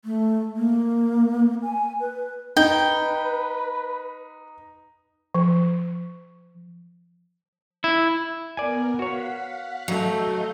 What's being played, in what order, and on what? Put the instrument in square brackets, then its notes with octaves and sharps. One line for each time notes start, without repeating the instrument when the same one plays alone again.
[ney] A3
A#3
G#5
B4
[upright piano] D#4 [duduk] B4 [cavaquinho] G5
[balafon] F3
[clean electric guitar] E4
[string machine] B3 A#4 [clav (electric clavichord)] D5 G#5
[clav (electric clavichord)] F#4 C#5 [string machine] F5 F#5 B6
[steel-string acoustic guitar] F#3 [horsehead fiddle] A3 [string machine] D#5 F5 G6